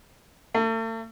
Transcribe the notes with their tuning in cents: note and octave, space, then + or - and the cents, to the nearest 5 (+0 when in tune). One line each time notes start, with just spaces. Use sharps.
A3 +40